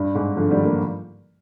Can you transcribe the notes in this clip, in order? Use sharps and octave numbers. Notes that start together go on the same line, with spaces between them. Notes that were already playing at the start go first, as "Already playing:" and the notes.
Already playing: G2
G#2
D3 F3
D#3 G3
G3 A#3